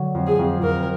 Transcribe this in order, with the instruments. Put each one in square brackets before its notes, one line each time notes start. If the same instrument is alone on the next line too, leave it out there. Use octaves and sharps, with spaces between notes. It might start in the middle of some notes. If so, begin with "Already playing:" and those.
Already playing: [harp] D3 F#3
F2
[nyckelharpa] G#4
[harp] F2
[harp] F2 [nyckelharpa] A#4